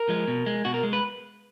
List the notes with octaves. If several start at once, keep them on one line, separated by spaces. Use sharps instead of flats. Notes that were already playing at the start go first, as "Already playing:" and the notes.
Already playing: A#4
F3 G#3
B2
G#3
B2 F#4
A#4
G#3
B4